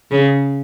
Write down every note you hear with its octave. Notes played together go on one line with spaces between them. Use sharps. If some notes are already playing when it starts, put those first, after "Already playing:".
C#3